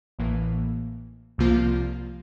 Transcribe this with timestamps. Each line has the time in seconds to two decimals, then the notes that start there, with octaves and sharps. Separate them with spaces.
0.19 A1 A2 E3 A#3
1.38 C2 C3 F3 A#3 F4